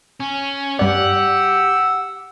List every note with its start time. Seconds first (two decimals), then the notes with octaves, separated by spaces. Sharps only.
0.20 C#4
0.79 G2 G4 D5 F#5 E6